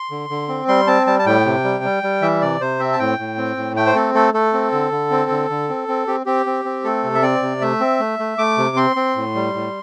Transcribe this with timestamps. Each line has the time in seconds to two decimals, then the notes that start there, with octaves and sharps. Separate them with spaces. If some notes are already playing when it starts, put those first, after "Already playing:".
Already playing: C6
0.11 D3
0.30 D3
0.49 C4
0.68 G3 C6
0.87 C4 A5
1.07 G3 A5
1.19 A5
1.26 A2 G5
1.45 C3
1.64 G3
1.84 G3
2.03 G3
2.22 E3 E5
2.41 C3 D5
2.61 C3 C5
2.79 C4 E5
2.93 A5
2.99 A2 G5
3.19 A2
3.38 C4
3.57 A2
3.76 A3 G5
3.86 C5
3.95 C4 A4
4.15 A3 A4
4.34 A3 A4
4.53 C4
4.72 D3
4.91 D3
5.11 C4
5.30 D3
5.50 D3
5.69 C4
5.88 C4
6.07 C4 G4
6.26 C4 G4
6.46 C4
6.65 C4
6.84 A3 A4
7.04 C3
7.15 E5
7.23 C4 D5
7.42 C3
7.61 A3 E5
7.80 C4
8.00 A3
8.19 A3
8.38 A3 D6
8.58 C3
8.76 C4 C6
8.96 C4
9.16 A2
9.35 G3
9.54 A2